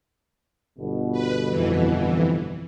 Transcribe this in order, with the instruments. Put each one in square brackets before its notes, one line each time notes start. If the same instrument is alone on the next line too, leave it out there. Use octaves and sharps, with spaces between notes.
[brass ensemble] G1 B2
[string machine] B4
F2 E3